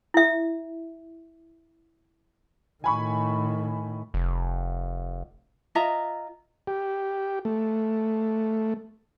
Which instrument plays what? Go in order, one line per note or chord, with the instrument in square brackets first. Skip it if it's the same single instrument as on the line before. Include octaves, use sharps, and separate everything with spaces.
[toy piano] E4 E5
[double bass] A2 D#3 [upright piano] G#5 B5 C#6
[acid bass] F1
[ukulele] F4 D#5 E5 A#5
[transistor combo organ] G4
A3